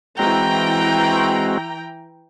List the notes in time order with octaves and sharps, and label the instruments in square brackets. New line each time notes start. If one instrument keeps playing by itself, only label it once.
[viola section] E3 G5 A#5 [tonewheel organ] G#3 C4 F#4